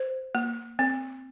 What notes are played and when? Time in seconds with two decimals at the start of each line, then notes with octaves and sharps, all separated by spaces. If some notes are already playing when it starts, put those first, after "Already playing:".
Already playing: C5
0.35 A#3
0.79 C4